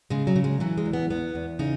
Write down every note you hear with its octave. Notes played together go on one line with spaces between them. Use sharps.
C#3 G#3
F#3
C#3
G#3
E3 F#3
G#3
E2
B3
E2 B3
E2
C#3 D#4